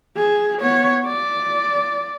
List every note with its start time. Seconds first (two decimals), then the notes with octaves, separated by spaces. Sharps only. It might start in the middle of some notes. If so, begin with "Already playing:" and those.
0.17 G#4
0.60 B3 C#5
1.06 D5